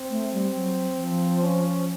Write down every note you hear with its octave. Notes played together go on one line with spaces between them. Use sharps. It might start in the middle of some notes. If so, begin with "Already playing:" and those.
Already playing: C4
A3
G3
F#3
F3
C#4